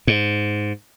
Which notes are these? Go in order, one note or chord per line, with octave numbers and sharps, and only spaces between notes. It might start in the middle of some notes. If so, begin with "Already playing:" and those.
G#2